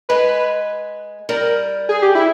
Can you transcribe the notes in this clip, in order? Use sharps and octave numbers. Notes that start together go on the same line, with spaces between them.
G#3 B4
G3 A#4
G#4
G4
E4